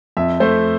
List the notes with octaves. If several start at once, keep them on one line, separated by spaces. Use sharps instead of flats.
F2 E5
A3 C5